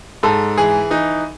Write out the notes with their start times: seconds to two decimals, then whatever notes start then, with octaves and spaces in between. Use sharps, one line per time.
0.23 G#2 A4
0.57 E3 G#4
0.90 E3 D#4